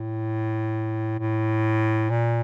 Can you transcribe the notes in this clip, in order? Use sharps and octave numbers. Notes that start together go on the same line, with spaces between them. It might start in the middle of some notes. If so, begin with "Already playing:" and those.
Already playing: A2
A2
A#2